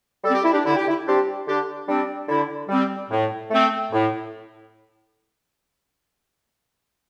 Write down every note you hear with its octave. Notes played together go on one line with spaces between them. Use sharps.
G3 C4 A4
G4
E4
D4 G4
D3 E4
G4
E4
G3 C4 D4 G4
D3 D4 G4
G3 C4 D4
D3 E4
G3 C4
A2
A3 C4
A2